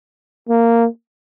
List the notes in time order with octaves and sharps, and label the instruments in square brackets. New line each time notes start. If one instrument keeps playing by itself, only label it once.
[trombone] A#3